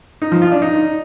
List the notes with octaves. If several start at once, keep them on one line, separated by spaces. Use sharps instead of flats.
D#4
F3
F4
D4
D#4